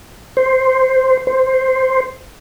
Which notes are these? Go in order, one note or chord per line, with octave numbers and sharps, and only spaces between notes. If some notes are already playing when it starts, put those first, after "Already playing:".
C5
C5